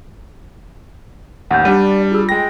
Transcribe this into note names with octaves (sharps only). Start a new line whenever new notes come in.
A1 D#2 F#5 G6
G3 D4 D#7
D5
F4 G#4 E6
G#3 G5 A#6